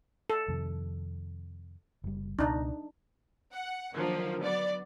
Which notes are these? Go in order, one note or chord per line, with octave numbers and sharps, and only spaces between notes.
A4
F2 C3 D#3
F#1 G3
C#2 B2 D4 D#4
F#5
D3 D#3 F3 F#3 A#3
F#3 B3 D5